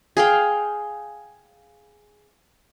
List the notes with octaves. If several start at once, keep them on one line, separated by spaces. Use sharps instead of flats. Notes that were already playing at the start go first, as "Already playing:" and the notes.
G#4 F5 G5